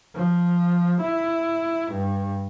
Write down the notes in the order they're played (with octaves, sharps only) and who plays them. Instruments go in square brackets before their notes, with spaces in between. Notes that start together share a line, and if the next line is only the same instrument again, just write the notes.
[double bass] F3
E4
G2